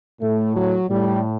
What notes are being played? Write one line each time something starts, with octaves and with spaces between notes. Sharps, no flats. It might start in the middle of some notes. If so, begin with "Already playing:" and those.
A2 A3
F#3
A2 G3